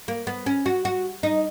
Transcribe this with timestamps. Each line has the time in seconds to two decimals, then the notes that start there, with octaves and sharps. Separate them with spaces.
0.08 A#3
0.27 B3
0.46 C#4
0.66 F#4
0.85 F#4
1.23 D#4